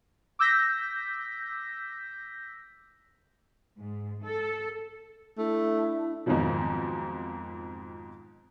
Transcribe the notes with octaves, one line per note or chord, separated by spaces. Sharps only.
D6 E6 G6 A#6 B6
G#2
A4
A3 D4 E4 E5
F2 G#2 B2 D#3 F3 F#3